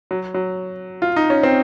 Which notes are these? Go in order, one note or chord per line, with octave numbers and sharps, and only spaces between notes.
F#3
F#3
F4
D#4
C#4
C4